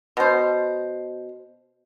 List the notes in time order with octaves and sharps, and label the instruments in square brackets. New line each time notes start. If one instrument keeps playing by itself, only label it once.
[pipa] B2 C5